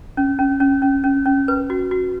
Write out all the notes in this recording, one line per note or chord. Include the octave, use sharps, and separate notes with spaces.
C#4
C#4
C#4
C#4
C#4
C#4
B4
F#4
F#4